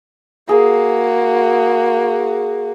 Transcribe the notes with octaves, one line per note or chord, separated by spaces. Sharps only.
A#3 F#4 G#4